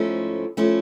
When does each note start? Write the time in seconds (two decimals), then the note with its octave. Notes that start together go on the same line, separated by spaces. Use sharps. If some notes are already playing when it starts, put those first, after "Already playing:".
Already playing: G#2 F3 A3 C#4 E4
0.57 F3 A3 C#4 E4